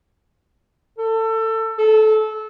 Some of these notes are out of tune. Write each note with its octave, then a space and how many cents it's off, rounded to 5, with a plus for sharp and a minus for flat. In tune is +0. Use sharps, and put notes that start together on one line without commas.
A4 +25
A4 -20